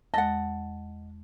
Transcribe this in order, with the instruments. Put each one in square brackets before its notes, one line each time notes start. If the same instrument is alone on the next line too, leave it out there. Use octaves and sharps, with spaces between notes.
[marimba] E2 G#3 [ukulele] D#5 F#5 [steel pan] A5